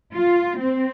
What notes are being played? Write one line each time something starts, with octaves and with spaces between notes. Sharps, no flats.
F4
C4